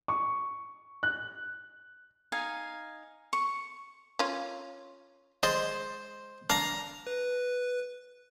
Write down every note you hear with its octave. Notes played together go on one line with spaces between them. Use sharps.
C#6
F#6
D#4 F5 G#5
C#6
C#4 F4
G#3 C5 D5 D#5
D4 F5 A#5
B4